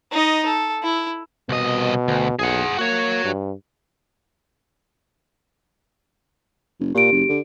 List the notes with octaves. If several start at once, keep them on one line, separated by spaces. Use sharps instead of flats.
D#4 D#5
A4
E4
C2 B2 D#5
D2
B1 G#4 F#5
A#3 F#4 C#5
G2
F#1
A#2 G4 D7
F#1
D3